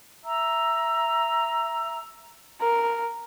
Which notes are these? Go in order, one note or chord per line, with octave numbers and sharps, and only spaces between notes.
E5 A#5 E6
A#4